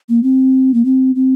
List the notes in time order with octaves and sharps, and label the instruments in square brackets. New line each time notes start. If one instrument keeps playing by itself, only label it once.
[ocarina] A#3
C4
A#3
C4
C4